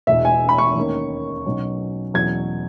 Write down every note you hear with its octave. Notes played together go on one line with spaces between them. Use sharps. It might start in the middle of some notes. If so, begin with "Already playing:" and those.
E1 E2 B2 E5
G#5
B5
C#6
D#2 D#3 A#3 C#4
B1 B2 F#3 C#4
E2 B2 F#3 C#4 G#6